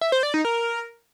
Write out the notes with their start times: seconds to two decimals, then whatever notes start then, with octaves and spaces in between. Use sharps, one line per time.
0.01 E5
0.12 C5
0.23 D5
0.34 D#4
0.45 A#4